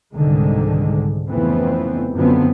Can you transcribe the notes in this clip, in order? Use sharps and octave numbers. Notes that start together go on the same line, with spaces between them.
C2 G#2 D3 D#3 G#3
F1 F2 C#3 E3 B3 C4
F#2 D3 F3 B3 C4